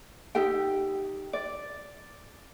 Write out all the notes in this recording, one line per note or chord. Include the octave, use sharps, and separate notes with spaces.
D#4 G4 A4 G5
D5